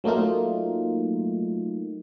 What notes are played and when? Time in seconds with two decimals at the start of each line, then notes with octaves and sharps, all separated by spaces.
0.04 F#3 A3 A#3 D#4 F4